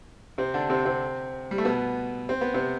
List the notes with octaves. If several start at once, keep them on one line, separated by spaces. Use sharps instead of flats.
C3 C4
D3 D4
C3 C4
C3 C4
G3
A3
B2 B3
C4
B3
C3 C4